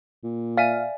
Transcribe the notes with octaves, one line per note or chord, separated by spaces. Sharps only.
A#2
D5 E5 F5 G#5